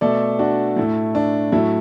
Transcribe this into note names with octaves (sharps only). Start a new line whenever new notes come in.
B2 A3 A4 D5
D4 F#4
A2 A3 E4
D4
A2 F#3 A3 E4